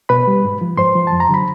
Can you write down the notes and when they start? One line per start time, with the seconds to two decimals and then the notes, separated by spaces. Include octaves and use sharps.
0.09 B2 B4 B5
0.27 G3
0.44 G#2
0.61 F3
0.78 G#2 C5 C6
0.95 F3
1.07 A5
1.13 F2
1.20 A#5
1.29 D3 F#3 B5